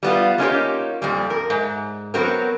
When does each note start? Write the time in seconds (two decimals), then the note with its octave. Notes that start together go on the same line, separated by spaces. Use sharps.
0.03 G3 B3 F4
0.38 G#3 A#3 C#4 D#4 F4 G4
1.02 F2 A#2 G3
1.30 A#4
1.50 G#2
2.14 F#3 B3 C4 F#4 A#4